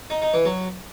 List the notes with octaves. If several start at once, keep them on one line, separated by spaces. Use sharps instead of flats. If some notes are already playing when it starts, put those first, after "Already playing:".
D#4
D#4
E3
F#3